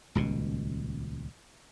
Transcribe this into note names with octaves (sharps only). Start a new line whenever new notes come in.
D#1 C#2 B2